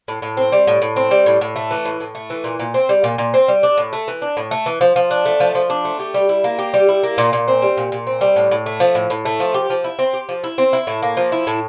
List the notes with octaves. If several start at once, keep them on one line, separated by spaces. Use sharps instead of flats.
A2
A2
C4
G3
A2
A2
C4
G3
A2
A2
A3
E3
A2
A2
A3
E3
A#2
A#2
C4
G3
A#2
A#2
C4
G3
D4
A2
A3
E3
D4
A2
A3
E3
F3
F3
D4
A3
F3
F3
D4
A3
G4
G3
E4
A#3
G4
G3
E4
A#3
A#2
A#2
C4
G3
A#2
A#2
C4
G3
A2
A2
A3
F3
A2
A2
A3
F3
G4
F3
E4
C4
G4
F3
E4
C4
E4
A2
A#3
F3
E4
A2